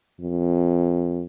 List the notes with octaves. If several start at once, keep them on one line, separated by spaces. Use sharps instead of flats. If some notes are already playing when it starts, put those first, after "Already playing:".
F2